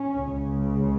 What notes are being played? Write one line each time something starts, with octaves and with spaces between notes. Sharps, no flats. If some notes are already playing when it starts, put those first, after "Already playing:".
Already playing: C#4
C#2 C#3